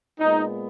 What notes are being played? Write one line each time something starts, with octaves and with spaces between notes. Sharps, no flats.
A#2 G#3 B3 D#4